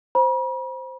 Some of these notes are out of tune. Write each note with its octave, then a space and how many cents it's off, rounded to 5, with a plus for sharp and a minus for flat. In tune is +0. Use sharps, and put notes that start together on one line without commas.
C5 +0 B5 -45